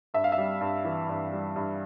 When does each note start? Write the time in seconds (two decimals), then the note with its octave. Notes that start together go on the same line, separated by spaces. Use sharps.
0.14 G2 E5
0.24 F5
0.32 E5
0.38 G3
0.61 G2
0.85 E3
1.09 G2
1.33 G3
1.56 G2